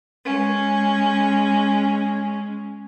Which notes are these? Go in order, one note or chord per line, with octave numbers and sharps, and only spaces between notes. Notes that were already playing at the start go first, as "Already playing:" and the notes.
G#3 C#4